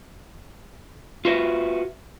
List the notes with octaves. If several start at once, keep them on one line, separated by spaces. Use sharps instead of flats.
F4 F#4 B4 D#5 E5